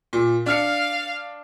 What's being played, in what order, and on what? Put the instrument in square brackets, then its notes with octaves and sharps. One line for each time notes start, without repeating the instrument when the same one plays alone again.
[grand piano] A#2
[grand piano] D4 F6 C#7 [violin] F5